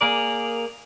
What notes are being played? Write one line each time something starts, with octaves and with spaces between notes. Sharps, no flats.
A#3 G#4 A#4 D5